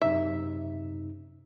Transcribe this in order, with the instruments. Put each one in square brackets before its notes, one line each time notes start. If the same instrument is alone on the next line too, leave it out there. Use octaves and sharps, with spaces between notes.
[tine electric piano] F#2 C3 D#4 [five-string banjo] E5